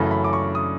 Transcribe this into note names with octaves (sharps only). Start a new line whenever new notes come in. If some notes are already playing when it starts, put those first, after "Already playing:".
Already playing: F#2 C#3 E3 A3 B5
B5
D6
C#6
D#6